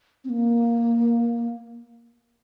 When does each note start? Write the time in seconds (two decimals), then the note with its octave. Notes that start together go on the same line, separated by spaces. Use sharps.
0.24 C4
0.30 A#3